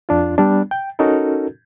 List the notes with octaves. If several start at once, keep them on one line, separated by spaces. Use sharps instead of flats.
F2 D4 F4
G3 B3 D4
G5
C#4 D#4 F#4 A4 A#4